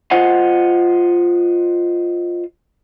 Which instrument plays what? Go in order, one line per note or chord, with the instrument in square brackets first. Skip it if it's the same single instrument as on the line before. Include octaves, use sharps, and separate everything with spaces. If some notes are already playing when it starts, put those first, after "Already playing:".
[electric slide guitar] F4 C5 D#5 F#5